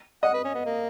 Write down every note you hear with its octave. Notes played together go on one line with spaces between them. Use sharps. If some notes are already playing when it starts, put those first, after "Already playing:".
D#5 F#5
B4
C#4
B3
A#3